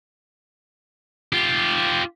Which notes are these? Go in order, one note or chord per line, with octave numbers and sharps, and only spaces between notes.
F4 G4